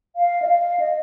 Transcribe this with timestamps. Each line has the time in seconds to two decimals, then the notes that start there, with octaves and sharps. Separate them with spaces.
0.16 F5
0.42 D#5
0.47 F5
0.80 D#5